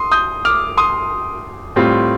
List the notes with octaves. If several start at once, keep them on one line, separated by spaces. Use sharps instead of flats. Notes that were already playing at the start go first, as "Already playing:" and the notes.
Already playing: C6 D#6
D#6 G6
D6 F6
C6 D#6
A2 G3 C4 F4